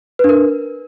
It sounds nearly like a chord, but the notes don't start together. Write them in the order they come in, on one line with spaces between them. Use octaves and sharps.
B4 D4 A#4